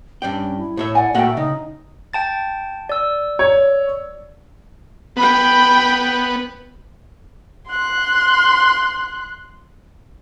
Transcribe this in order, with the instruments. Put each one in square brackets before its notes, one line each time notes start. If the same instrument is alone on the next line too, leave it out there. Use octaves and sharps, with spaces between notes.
[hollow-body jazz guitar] G2 D5 G5 [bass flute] C#4
[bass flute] E4
[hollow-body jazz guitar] A2 C#5 E5
[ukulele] D5 F#5 G#5
[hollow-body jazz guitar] A#2 A3 F#5 [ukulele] F#4 D5 G5 [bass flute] E5
[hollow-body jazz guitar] C#3 [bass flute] D#4 [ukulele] D#5
[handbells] G5 A5 A6
D5 E6
[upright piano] C#5
[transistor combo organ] B3 [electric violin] G5 B5
[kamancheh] C6 F#6